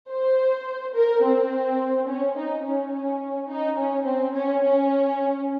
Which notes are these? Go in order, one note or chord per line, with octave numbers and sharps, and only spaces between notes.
C5
A#4
C4
C#4
D#4
C#4
C#4
D#4
C#4
C4
C#4
C#4